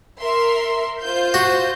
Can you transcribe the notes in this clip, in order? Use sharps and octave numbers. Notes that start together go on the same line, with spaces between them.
A#4 E5 C6
F4 C5 G6
F#4